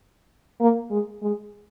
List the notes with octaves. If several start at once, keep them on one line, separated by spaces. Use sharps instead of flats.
A#3
G#3
G#3